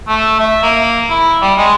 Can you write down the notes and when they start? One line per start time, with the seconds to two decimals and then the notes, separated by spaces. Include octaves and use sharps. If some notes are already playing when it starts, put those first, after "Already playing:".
0.08 A3
0.40 E5
0.63 A#3
1.10 E4
1.42 G3
1.58 G#3